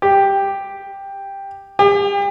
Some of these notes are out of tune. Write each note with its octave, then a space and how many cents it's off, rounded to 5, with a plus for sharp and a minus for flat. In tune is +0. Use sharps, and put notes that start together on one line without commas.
G4 +5
G4 +40